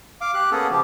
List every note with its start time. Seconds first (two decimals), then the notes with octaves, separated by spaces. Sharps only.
0.21 F5 D6
0.34 G4 F#6
0.52 A#3 B3 C#4 G#4 A4
0.71 C#3 F3 G4